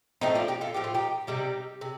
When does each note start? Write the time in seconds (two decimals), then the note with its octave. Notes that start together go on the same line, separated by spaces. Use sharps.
0.21 A2 F3 A3 C4 D#4
0.35 D4 F4
0.48 D#4 G4
0.61 F4 A4
0.74 A2 F3 A3 G4
0.84 F4
0.94 D#4 G4
1.27 C3 G3 D#4 G4
1.81 C3